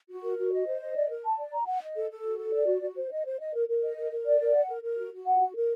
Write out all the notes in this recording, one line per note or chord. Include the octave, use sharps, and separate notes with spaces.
F#4
A#4
F#4
D#5
C5
D#5
D5
A#4
A5
D5
A#5
F#5
D#5
A4
A4
F#4
A4
D5
F#4
F#4
C5
D#5
C5
D#5
A#4
A#4
D#5
A#4
A#4
D5
A#4
F#5
A#4
A#4
F#4
F#4
F#5
F#4
A#4